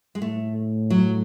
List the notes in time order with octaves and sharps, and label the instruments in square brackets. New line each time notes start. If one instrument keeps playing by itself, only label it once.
[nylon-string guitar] G#3
[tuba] A2 [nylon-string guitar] A3
[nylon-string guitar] F#3